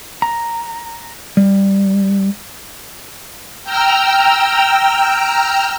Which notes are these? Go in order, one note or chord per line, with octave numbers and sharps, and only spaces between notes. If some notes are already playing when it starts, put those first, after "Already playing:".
A#5
G3
G5 A#5 E6 F6